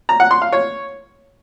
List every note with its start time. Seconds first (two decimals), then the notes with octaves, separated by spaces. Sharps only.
0.09 A#5
0.20 F#5
0.31 C6
0.42 F5
0.53 C#5